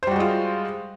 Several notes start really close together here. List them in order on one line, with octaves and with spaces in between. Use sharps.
C5 G3 F#4 G#3 F4